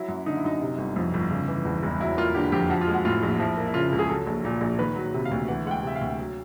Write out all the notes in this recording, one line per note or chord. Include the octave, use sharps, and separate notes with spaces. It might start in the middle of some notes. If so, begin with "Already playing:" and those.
Already playing: F#3 E4
F#2
D3 D#4
E4
F#2 D#4
C3
G1
F2
G1
C#3
E3
E2
E1
F#3 E4
A#3 F4
D3 G4
F2 G4
F3 F#4
F4
G#3
F#4
A2 F4
A#1
F3 E4
A#3
E4
C#3 F4
C#2
G#4
F#3 A4
A#1
A#2
A#1
D#3 B4
F#3
C3
F5
D2
E3 F#5
G#3 F#5
G5
C3 E5
F5
D2
F#3